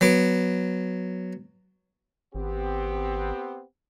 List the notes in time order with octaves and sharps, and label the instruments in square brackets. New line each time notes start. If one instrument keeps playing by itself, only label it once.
[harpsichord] F#3 B3 D6
[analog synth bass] G#1 [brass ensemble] B3 C4 G4